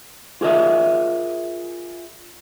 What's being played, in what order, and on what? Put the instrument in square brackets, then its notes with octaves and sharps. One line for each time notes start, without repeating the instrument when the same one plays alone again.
[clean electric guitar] F4 G#4 A#4 D#5 E5